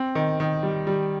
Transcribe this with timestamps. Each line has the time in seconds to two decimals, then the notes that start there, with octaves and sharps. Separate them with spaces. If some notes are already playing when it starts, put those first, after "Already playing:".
Already playing: C4
0.15 D#3
0.40 D#3
0.63 G3
0.87 G3